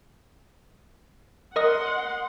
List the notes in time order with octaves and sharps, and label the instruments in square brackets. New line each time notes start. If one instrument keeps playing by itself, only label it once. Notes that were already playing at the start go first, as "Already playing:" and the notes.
[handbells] A#4 D#5 D#6 [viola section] F#5 C6